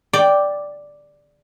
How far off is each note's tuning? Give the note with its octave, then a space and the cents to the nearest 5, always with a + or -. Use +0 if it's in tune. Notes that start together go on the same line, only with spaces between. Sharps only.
D5 +0 G5 +0